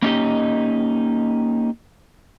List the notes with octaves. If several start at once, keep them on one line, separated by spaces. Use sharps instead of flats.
A#3 C#4 D#4 F4 G4 D#5